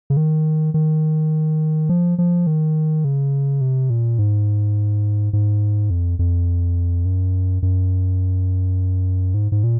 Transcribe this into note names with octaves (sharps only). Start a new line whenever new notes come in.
C#3
D#3
D#3
F3
F3
D#3
C#3
C3
A#2
G#2
G#2
F2
F2
F#2
F#2
G#2
G#2
A#2